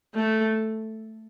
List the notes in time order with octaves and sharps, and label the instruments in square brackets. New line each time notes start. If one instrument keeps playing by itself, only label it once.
[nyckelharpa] A3